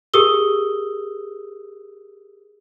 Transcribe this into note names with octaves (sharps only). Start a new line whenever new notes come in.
G4 G#4 A#4 D#6 E6 G7